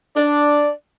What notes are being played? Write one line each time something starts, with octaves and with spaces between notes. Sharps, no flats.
D4 D5